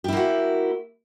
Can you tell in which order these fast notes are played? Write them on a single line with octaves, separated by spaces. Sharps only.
G4 E4 A#3 F#4